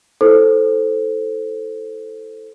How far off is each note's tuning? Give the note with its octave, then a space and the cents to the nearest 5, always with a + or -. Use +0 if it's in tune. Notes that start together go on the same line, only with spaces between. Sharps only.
E4 -15 A4 +0 C5 +0